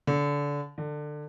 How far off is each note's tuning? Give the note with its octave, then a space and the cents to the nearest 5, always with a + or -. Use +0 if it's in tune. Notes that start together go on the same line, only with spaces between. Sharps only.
D3 -25
D3 +20